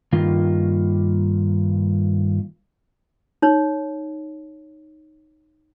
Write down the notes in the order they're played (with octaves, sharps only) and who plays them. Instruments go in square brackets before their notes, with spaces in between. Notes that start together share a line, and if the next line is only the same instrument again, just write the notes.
[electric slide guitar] G2 D#3 A#3 F4
[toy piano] D#4 C#5